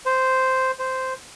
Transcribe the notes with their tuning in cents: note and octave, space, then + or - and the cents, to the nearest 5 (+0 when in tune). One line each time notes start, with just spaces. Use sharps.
C5 -5
C5 -5